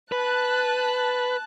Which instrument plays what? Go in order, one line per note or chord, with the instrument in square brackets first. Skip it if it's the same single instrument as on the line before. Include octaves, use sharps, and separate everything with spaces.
[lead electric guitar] B4 [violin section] A5 F#6